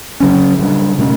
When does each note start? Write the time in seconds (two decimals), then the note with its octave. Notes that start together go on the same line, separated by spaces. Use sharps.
0.20 C#3 F#3 C#4
0.59 C#3 G3 D4
0.99 B2 A3 C#4